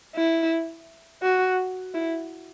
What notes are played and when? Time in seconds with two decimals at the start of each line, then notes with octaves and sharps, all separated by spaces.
0.15 E4
1.23 F#4
1.94 E4